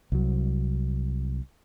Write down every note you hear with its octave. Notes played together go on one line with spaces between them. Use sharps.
C2 F#3